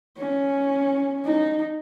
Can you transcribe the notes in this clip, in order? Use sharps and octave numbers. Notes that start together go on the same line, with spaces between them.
C#4
D#4